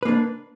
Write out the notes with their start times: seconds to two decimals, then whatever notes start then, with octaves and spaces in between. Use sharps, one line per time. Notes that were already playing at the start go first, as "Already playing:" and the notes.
0.03 B4
0.05 A#3
0.08 D4